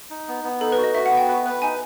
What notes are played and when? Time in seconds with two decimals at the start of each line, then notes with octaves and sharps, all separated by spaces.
0.10 D#4
0.28 B3
0.44 B3
0.61 D#4 A4
0.72 B4
0.78 F#4
0.84 D#5
0.95 F#4 E5
1.06 F#5
1.12 B3
1.17 G5
1.28 B4
1.45 B4
1.62 D#4 G#5